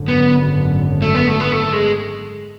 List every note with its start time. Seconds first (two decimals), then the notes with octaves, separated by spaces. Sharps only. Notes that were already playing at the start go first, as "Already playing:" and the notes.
Already playing: G#1 F#2 D3
0.08 B3
1.02 A3
1.15 B3
1.28 A3
1.40 B3
1.52 A3
1.72 G#3